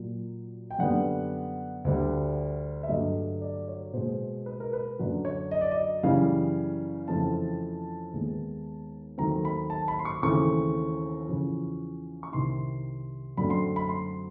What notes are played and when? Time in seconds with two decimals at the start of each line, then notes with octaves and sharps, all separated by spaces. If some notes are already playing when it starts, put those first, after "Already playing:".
Already playing: A#2 F#3 A#3
0.71 G5
0.79 F#2 D3 G3 B3 F#5
1.85 D2 D3 G3
2.83 E5
2.88 G2 D3 F#3 A3 D#5
3.42 D5
3.68 C#5
3.94 B2 G#3 B3 C5
4.46 B4
4.60 A#4
4.73 B4
4.99 F#2 D3 F#3
5.25 C#5
5.51 D#5
5.61 D5
5.71 D#5
6.03 F#2 C#3 E3 G3 F5
7.08 F2 C#3 E3 A3 C4 A5
8.14 D#2 D#3 G#3 B3
9.18 D#2 D#3 F#3 A3 C4 A#5
9.45 B5
9.70 A5
9.88 B5
9.99 C6
10.05 C#6
10.22 D#2 C#3 E3 A3 C4 C#6
11.27 E2 C#3 F3
12.23 C#6
12.32 C2 C3 D#3 C6
13.37 F#2 D3 F#3 A3 C4 B5
13.50 C6
13.76 B5
13.89 C6